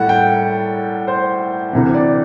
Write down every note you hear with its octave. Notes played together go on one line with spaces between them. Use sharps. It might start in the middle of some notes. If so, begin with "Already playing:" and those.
Already playing: A2 G3 A4 F#5
G5
C5
D2 C3 E3
D5